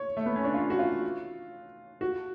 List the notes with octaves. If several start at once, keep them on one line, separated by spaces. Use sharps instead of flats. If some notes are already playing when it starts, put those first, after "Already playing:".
Already playing: C#5
A3
B3
C#4
D4
F4
F#4
F4
F#4